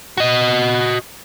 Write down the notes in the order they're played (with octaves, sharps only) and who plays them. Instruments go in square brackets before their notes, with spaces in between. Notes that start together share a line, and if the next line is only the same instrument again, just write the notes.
[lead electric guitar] F#4 D#5